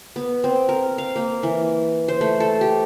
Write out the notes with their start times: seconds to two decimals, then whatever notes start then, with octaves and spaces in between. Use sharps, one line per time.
0.16 B3
0.44 C4
0.69 A#4
0.98 F5
1.16 A#3
1.43 E3
2.08 C5
2.21 A3
2.40 A4
2.61 G4